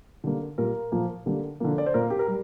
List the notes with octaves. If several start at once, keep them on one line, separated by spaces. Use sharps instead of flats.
D3 G3 A#3
A#2 G3 A#3 A#4
A#2 F3 A#3
D3 G3 A#3
D3 F3 A#3
D5
C5
A#2 A#3 A#4
G4
A#4
G3